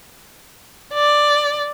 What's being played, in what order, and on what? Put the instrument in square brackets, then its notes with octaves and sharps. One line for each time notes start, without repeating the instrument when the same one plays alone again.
[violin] D5